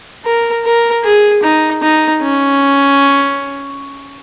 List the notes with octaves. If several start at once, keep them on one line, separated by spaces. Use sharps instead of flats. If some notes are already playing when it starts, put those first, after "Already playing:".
A#4
A#4
G#4
D#4
D#4
C#4